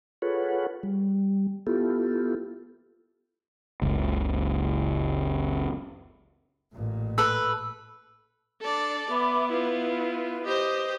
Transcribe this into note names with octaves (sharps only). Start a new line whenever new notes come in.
F4 G#4 A4 B4 C#5 F#5
G3
B3 E4 F4 G4 A4
F#1 C#2
A1 A#2
A4 B4 E6
D4 A4 D5
B3 E5 B5 D6
E4 F4 B4
G4 C5 D#5